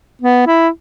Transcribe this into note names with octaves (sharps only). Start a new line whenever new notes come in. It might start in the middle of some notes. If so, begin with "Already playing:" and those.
B3
E4